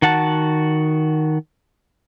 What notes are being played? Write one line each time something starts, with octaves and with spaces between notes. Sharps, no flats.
D#3 F#4 F#5 A5